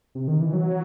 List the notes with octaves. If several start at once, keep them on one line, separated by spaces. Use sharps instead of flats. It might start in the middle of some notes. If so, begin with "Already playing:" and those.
C3
D#3
E3
F#3